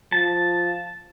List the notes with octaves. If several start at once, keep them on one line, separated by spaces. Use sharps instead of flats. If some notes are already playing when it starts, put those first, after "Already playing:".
F3 A5